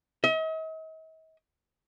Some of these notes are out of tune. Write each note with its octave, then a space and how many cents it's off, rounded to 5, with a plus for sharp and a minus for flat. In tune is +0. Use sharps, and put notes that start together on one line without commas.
D#5 +45